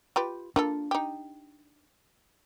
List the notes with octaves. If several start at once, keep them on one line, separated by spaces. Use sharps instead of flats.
F4 G4 B4
A#3 D4 F4 A4
D#4 G4